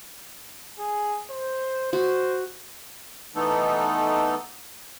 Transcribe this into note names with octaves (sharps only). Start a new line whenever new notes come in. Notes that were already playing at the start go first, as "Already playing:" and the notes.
G#4
C5
F#4 C5
E3 A3 B3 D#4 A4